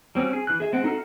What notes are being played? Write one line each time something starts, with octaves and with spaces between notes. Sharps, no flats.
G3 C4 C#4 F#4
G#4
E3 F#6
G#4 E5
G#3 C4 F#5
D#4 F#4 A4 F5 F#5